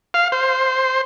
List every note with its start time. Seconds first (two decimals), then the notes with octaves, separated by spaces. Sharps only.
0.14 F5
0.32 C5